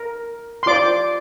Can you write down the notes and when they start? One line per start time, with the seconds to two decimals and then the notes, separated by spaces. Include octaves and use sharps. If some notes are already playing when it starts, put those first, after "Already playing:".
Already playing: A#4
0.63 C6
0.66 F4 C5 D5 D6